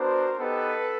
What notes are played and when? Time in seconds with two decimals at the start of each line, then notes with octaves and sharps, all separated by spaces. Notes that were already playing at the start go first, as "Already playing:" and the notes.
Already playing: B3 D4 F#4 A#4 C5
0.39 B3 D#4 G4 A4 B4